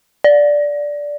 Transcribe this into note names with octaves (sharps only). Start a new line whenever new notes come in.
D5